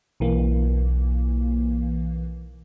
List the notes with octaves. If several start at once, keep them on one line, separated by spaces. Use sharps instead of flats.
B1 E3 A#3